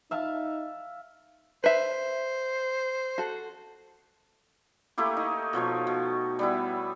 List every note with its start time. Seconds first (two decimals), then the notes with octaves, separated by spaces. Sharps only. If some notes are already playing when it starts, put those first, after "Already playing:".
0.11 D#4 E5 F5 A5
1.64 B4 C5 E5
3.18 F#4 A4
4.98 A3 A#3 E4 G4
5.17 D#4
5.53 B2 F3 C#5 C#6
5.87 B2
6.39 G3 B3 E4